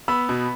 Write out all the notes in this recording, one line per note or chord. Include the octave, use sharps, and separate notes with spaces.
B3 B5 E6
B2